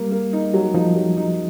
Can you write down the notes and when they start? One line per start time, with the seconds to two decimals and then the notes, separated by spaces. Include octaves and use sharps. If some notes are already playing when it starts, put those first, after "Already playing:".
Already playing: G3 A#3
0.12 A#3
0.33 D#4
0.54 F#3
0.74 F3 D#4
0.95 F#3
1.17 D#4